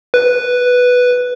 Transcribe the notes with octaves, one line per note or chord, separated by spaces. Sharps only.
B4